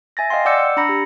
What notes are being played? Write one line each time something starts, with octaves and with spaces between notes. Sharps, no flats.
E5 G#5 A6 A#6
D#5 F5 G5 C6
D5 F#5 D6 E6 G6 C#7
E6
D4 A#5 B5 A#6 C#7
G4